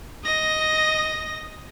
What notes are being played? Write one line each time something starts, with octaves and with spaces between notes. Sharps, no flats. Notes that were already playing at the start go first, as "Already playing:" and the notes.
D#5 A#6